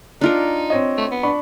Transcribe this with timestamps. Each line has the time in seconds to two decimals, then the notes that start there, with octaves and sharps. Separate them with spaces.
0.21 D4 D#4 F4 A#4
0.70 C4 C#5 D#5
0.97 A3
1.11 B3
1.23 D4 B5 C#6